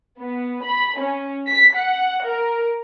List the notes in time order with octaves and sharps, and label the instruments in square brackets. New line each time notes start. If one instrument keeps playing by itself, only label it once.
[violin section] B3
B5
C#4
B6
F#5
A#4